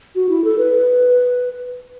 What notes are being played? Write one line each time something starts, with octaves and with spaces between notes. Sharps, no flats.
F#4
E4
A4
B4